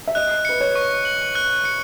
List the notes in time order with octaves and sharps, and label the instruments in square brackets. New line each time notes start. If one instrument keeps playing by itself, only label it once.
[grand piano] E5
[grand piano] D#5 [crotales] F#6
[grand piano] B4 [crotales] C#7
[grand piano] C#5
[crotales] C#6
F#7
F#6
C#7